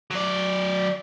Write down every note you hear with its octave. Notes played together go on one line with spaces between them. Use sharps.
F#3 D5